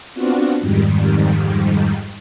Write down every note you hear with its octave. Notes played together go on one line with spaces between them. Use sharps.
B3 C4 D4 F4 F#4
F2 G#2 D#3 G3